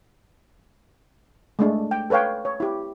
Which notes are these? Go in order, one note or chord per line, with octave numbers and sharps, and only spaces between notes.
G#3 A3 D4
G5
A4 B4 C#5 F5 G5
C#5
E4 G4